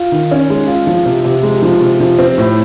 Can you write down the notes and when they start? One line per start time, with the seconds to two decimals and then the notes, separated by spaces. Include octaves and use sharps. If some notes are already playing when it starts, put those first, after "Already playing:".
Already playing: F4
0.12 D#3
0.31 C#4
0.50 G#3
0.68 F4
0.87 F3
1.06 C3
1.25 C3
1.43 G#3
1.62 F3
1.81 C3
2.00 F3
2.19 C4
2.38 A2